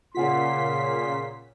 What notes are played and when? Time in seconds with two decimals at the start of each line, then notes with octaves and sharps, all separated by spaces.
0.15 A#2 C#3 A#3 F4 F#5 G#5 C6 B6